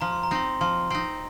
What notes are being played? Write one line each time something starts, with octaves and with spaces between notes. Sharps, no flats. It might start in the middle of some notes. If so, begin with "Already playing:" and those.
F3 A#5
C6
A#5
C4 D#4 C6
A#5
F3 C6
C4 D#4 C6